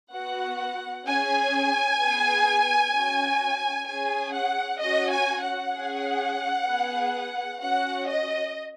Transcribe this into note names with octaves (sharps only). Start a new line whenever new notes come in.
B3 F#4 F#5
C#4 G#4 G#5
B3 G#4
C#4 F#4
C#4 G#4 G#5
F#5
C#4 F#4 D#5
G#5
F#5
C#4 G#4
B3 G#4
C#4 F#4 F#5
D#5